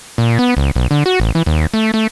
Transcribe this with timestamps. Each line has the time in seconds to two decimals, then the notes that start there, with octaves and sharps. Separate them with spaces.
0.18 A#2
0.39 B3
0.57 C#2
0.76 B1
0.91 D3
1.06 F#4
1.20 A1
1.35 E3
1.46 D#2
1.74 A3
1.94 A3